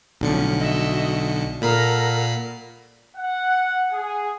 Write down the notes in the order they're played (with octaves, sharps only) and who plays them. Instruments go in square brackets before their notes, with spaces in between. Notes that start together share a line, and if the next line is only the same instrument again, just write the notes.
[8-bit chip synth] B1 D3 C#7 [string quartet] A2 F3 C#4
[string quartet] F#4 D#5 E5
[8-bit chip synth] A#2 B5 C7 [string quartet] A4 F#5 A#5 [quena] A#4
[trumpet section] F#5
G#4